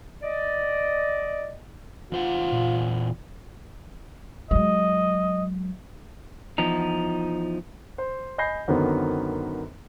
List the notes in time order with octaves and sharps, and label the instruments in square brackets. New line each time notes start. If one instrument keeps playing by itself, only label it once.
[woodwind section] D5 D#5
[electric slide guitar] E2 C5 F#5 [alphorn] F4
[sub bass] A#2
[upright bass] F#3 G#3 [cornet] D#5
[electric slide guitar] E2 F3 D#4
[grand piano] C5
D#5 G#5 B5 G6 A#6 C7
F#2 D3 D#3 B3 C4